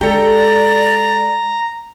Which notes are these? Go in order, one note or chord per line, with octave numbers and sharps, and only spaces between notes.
G#3 G4 A4 D5 A#5